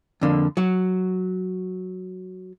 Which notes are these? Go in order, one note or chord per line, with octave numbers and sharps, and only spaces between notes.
F2 D3 A#3
F#3 F#4